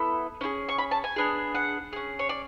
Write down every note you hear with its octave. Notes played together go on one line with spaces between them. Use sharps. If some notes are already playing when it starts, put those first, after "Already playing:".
Already playing: B3 E4 A4
C#4 E4 G#4
C#6
B5
A5
G#5
B3 D4 G#4
F#5
C#4 G#4
C#5
D5